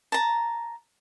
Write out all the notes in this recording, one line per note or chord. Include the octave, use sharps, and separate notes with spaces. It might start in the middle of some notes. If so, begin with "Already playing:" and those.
A5 A#5